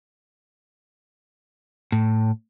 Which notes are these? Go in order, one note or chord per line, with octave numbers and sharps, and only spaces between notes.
A2